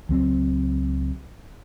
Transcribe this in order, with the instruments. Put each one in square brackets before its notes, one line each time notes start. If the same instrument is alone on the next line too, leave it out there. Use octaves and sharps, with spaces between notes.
[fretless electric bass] C#2 F#3 C4